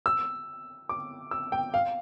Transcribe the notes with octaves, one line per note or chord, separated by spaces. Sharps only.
E6
D6
E6
G5
F5